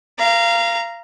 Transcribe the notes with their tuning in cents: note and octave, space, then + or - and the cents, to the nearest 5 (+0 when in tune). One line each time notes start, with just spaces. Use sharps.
F5 -25 A#5 +0